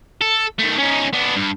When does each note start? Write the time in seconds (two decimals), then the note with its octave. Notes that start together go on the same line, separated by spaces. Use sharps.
0.21 A4
0.59 D#3 A3
0.78 C#4 D#4
1.13 B3 D4
1.36 G2